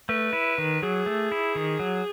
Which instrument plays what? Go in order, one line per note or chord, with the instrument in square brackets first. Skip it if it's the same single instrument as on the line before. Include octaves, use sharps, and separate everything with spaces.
[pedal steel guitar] A3 [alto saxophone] B4
[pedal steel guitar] E4
D#3
[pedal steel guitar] F#3 [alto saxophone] G#4
[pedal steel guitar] A3
E4
D#3
F#3